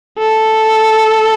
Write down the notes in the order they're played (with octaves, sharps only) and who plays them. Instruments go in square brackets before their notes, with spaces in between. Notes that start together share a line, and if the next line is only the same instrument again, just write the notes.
[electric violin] A4